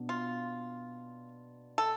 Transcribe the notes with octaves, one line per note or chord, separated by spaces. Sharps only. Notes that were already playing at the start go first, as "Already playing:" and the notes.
Already playing: B2 B3 D4
F4
A4